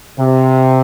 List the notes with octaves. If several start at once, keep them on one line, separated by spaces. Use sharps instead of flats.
C3